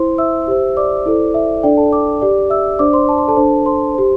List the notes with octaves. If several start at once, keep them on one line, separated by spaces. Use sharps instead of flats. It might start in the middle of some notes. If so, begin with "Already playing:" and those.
Already playing: E4 C5 C6
E5 E6
G4 C5
D5 D6
E4 A4 C5
E5
D4 A4 D5 G5
A4 A5
D5 D6
G4 D5
E5 E6
D4 C5 D5 D6
C5 C6
A5
C6
A4 A5
D4 C5
C5 C6
G4 C5